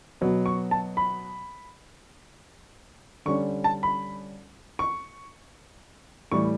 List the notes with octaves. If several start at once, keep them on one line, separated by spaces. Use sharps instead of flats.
B2 F#3 B3
C#6
A5
B5
D3 G3 C#4 C#6
A5
B5
C#6
A2 E3 G3 C#6